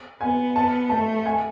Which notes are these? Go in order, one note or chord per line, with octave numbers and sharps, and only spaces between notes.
B3 G#5
A5
A3 A5
G#5